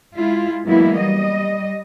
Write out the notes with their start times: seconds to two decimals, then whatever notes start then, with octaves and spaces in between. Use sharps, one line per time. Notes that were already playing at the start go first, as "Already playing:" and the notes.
0.15 G#3 E4 F4
0.66 E3 F#3 G#3 A#3 B3 E4
0.97 G3 D#5